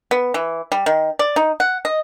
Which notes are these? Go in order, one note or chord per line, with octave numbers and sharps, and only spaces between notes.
B3
E3
G3
D#3
D5
D#4
F#5
D#5